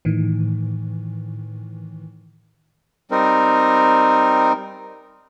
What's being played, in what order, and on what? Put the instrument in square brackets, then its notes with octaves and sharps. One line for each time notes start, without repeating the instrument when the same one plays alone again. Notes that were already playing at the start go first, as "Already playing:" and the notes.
[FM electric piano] A2 D#3 E3
[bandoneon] G3 C4 D#4 A#4